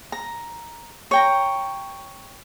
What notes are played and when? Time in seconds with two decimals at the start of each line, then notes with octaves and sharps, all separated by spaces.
0.12 A#5
1.11 C#5 G5 A#5